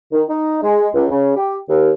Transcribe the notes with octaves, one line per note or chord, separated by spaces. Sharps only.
D#3
D#4
G#3
C#2
C#3
G4
D#2